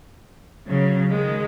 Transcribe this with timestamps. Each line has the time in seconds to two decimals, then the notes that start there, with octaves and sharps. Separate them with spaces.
0.68 C#3 F#3
1.10 D#3 G#3